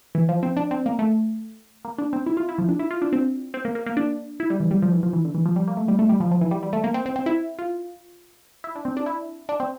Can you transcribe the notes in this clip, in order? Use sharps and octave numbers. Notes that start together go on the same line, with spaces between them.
E3
F3
C4
D4
C4
A#3
A3
A#3
D4
C4
E4
F4
E4
F3
D4
E4
F4
D4
C4
C4
A#3
A#3
A#3
D4
E4
G3
E3
G3
F3
E3
F3
E3
D3
E3
F3
G3
A#3
A3
G3
A3
G3
F3
F3
E3
G3
G3
A3
A#3
C4
C4
C4
E4
F4
E4
D4
C4
D4
E4
D4
C4